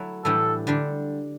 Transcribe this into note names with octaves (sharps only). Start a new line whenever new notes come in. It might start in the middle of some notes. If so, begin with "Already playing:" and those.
Already playing: F#3 A3 E4
A2 E3 G3 D4 A4
D3 G3 D4